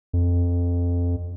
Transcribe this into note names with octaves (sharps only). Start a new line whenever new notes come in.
F2